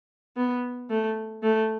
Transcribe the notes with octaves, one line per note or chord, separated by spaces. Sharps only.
B3
A3
A3